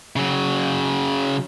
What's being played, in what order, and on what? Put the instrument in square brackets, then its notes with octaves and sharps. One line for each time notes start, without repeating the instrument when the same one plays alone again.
[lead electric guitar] C#3 F#3